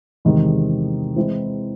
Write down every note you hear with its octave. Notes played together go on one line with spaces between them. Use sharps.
E2 C3 D#3 G#3
E3 G#3 C4 E4